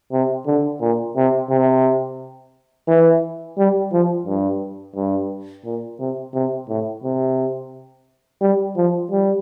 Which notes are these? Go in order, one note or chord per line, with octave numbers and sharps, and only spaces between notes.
C3
D3
A#2
C3
C3
E3
G3
F3
G2
G2
A#2
C3
C3
A2
C3
G3
F3
G3